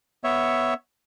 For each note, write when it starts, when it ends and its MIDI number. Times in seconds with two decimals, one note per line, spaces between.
0.24 0.74 59
0.24 0.74 73
0.24 0.74 76